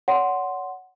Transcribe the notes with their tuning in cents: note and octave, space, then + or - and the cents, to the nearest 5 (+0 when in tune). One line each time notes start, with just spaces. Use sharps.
C#5 +35 F#5 +0 C6 +0